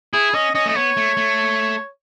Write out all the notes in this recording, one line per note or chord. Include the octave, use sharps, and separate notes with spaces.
E4 G#4
C#4 D#5
C#4 D#5
A3 D#5
B3 C#5
A3
A3